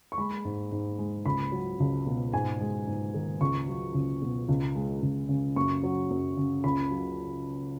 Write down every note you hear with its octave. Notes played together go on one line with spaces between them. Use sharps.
C#6
G#3 B5
G#2
G#2
G#3
C#2 B5
F#3
C#2
B2
G#2 G#5
G#3
G#2
D#3
C#2 C#6
F#3
C#2
B2
C#2
G#3
C#2
C#3
F#2 C#6
F#3
F#2
C#3
C#2 B5
F#3